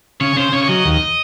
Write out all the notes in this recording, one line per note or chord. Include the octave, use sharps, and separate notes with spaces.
C#3 C#5
C#3 C5
C#3 C#5
C#5
F#3 D#5
D#2